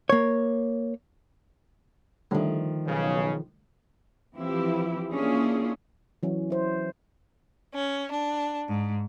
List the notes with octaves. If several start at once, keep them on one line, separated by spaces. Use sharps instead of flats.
A#3 C#5
D3 D#3 F3 G3 A3
B1 C#3
E3 F3 C4 E4 G4
A#3 C#4 D4 E4 F4 G#4
E3 F#3 C#4
E4 C5
C#4
D4
G#2